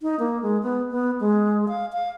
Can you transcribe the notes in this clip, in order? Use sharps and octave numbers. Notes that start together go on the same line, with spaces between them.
D#4
A#3
G#3
B3
B3
G#3
F5
F5